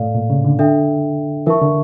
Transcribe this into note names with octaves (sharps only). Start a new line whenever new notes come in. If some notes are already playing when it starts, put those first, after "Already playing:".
Already playing: A2 A4 D5 F5
A#2
C#3
D3
D4 A4 E5 G5
E3 A#4 E5 A5 C#6
D3